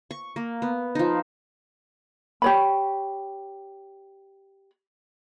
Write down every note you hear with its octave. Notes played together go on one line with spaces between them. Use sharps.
C#6
A#3
B3
F3 D#4
G4 C#5 B5